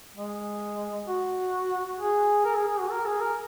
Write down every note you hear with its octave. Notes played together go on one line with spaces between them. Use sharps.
G#3
F#4
G#4
A#4
G#4
G#4
F#4
A#4
G#4
A#4